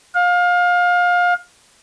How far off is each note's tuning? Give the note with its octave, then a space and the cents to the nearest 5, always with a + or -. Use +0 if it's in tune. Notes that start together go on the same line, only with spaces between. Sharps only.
F5 +25